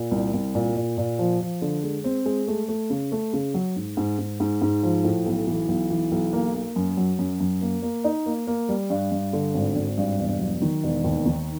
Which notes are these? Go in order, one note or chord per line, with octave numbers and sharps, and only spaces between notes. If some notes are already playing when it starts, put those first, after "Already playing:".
Already playing: A#2
C2
C2
A#2
A#2
A#2
F3
F3
D3
G#3
C4
G#3
A3
A3
C#3
A3
C#3
F#3
G#2
G#2
G#2
G#2
G#2
F3
A2
B1
E3
B1
E3
B1
A#3
A#3
F#2
F#3
F#2
F#2
A#3
A#3
D#4
A#3
A#3
G3
G2
G2
D3
G#1
G#1
G2
E1
F#3
D#3
E1
D#2
D#3